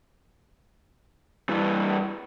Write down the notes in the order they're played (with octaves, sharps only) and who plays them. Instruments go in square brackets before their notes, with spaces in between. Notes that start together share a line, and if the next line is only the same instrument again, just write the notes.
[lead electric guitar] G2 E3